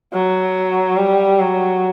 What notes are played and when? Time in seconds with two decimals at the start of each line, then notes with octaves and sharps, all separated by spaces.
0.13 F#3
0.97 G3
1.39 F#3